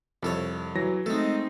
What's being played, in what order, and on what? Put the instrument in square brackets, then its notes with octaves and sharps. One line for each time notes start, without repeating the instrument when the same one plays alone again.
[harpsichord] C2 A4 C#5 [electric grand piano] F2
[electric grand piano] E3 F#3 A#6
[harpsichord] G#3 A4 [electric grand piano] A3 [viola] C4 D#4